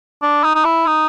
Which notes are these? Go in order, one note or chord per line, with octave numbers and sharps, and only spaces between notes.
D4
D#4
D#4
E4
D#4